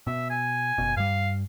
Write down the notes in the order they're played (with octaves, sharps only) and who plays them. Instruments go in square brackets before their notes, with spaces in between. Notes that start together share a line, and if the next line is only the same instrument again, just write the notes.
[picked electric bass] B2 [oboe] E5
[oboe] G#5
[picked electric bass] F#1 B2
[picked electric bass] G2 G3 [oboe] F5